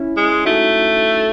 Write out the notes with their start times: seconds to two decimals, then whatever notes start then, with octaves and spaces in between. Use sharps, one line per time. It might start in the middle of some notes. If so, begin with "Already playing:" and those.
Already playing: C#4 E4
0.17 G#3
0.45 A3 D#4 F#4